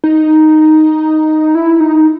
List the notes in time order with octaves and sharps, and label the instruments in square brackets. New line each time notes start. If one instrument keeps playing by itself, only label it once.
[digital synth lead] D#4
E4
D#4